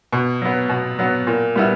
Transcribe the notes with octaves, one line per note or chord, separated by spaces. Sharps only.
B2
F#3 B3
B2
F#3 B3
A#2
G3 B3 E4